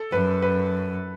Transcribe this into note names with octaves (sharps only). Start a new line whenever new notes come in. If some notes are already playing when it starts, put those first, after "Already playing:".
Already playing: A4
F#2 B4
B4